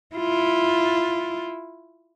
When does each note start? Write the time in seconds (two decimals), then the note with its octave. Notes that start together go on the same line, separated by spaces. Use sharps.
0.16 E4 F4